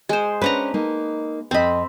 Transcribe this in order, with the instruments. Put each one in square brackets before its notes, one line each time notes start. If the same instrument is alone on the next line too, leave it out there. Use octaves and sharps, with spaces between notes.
[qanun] G#3 C5
[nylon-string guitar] C#4 D4 C5 [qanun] B4 F#5 A#5
[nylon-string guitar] A#3 D#4
[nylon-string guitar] F2 D#5 [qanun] C4 B5